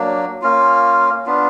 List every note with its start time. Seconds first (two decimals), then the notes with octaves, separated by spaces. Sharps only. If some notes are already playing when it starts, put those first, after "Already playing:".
Already playing: F#3 A#3 D4
0.42 A#3 C#4 F4
1.26 B3 D4 F4